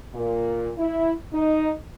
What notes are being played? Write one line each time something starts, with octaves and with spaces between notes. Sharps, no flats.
A#2
E4
D#4